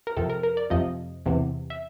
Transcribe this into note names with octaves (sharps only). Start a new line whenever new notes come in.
A#4
F2 C3 F3 A4
A#4
A#4
D5
F2 C3 F3 D#5
E2 C3 E3
E5